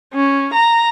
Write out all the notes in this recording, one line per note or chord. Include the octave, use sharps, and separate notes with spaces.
C#4
A#5